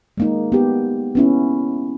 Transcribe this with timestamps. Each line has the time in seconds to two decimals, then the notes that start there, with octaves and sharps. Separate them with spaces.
0.17 G#3 A#3 D#4
0.52 B3 G4
1.15 B3 C#4 E4